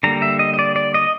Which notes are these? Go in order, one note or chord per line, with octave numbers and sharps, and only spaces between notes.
D3 G3 A#3 A#5
E5
D#5
D#5
D5
D5
D#5